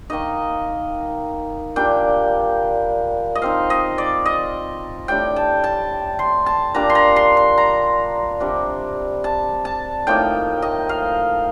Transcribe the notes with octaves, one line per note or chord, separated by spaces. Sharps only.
D#3 A#3 D#4 D#5
A#2 G3 D4 G5
D#5
F3 C4 D#4 F5
D#5
D5
D#5
A2 G3 D4 G5
A5
A5
C6
A5
A#2 G3 D4 A#5
C6
A#5
C6
C6
A#5
C3 G3 D4
A5
A5
A2 F3 A#3 D#4 G5
D#5
F5